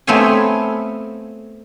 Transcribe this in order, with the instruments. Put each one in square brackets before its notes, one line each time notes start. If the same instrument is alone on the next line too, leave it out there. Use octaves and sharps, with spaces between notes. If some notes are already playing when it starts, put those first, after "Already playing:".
[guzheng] A3 B3 C4 C#5 F5 G#5